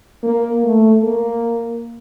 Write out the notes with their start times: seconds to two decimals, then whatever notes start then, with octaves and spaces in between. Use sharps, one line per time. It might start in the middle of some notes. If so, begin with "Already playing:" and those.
0.23 A#3
0.64 A3
1.03 A#3